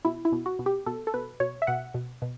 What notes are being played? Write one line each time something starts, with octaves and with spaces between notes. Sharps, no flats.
B2 E4
E4
B2
F#4
B2
G4
B2 A4
A4
B2 B4
B2 C#5
E5
B2 F#5
B2
B2